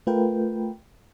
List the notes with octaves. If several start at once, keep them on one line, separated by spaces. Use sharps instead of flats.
A3 F4 A#4 B4 G5